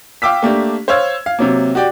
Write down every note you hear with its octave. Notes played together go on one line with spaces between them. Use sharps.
F5 G5 D6 E6 B6
A3 A#3 D4 G4
C5 C#5 F5 E6 G#6
F5
C3 F#3 A#3
F#4 G4 D5 G5